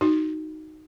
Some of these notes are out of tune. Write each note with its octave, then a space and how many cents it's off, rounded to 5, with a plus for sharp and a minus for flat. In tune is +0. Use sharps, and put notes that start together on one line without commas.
D#4 +0 F#4 +5